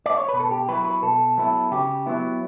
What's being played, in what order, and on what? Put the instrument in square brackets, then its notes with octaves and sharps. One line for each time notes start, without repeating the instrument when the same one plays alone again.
[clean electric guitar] D5
C#5
B2 B4
A4
G4
F#3 B3 E4 B4
B4
B2 A4
F#3 B3 E4
C#3 G4
F#3 B3 E4